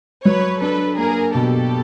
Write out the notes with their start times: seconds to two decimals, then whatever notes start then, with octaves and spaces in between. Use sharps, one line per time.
0.25 F#3 B4 C#5
0.61 D4 A4 B4
0.98 A#3 G#4 A#4
1.35 B2 G4 A4